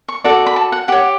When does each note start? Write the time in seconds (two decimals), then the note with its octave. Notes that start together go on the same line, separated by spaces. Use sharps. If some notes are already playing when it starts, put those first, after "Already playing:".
0.08 C#6
0.24 F#4 A4 D5
0.46 B5
0.56 A5
0.72 F#5
0.88 G4 C#5 F#5